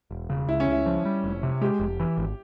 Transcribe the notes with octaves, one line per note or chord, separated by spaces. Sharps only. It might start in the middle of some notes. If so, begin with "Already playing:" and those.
E1
C#3
C#2 E4
C#4
C#2 E4
F3
G3
F1
C3
G#3 G4
F1
E3
G#1